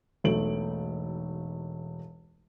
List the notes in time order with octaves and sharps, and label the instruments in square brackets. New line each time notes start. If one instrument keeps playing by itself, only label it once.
[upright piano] E1 B1 A3 D7 F#7